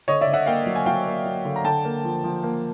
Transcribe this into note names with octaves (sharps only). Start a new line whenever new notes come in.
D3 C#5 D#5
D5 E5
D3
E5 F#5
A#3 F5 G5
F#3
G#5
F#3 F5 G5
A#3
F#3
D3
A#5
D3 G5 A5
A#3
F3
F3
A#3